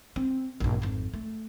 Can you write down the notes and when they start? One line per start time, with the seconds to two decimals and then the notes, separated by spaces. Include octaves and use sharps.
0.16 C4
0.60 A#1 G2
0.82 G#1 F2
1.14 A3